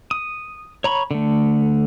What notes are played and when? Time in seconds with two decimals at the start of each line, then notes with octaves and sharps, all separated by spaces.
0.11 D#6
0.84 C#5 A#5 B5 C#6
1.11 D3 A3